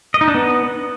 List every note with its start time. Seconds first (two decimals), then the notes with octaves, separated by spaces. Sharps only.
0.14 D#5
0.21 D#4
0.28 D4
0.35 B3